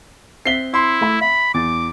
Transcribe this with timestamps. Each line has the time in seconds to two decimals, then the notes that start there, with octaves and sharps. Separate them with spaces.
0.46 C4 E5 B6 C7 G7
0.74 E4 C6
1.01 A3 E5 B5
1.21 E5 B5
1.54 E2 D6 A6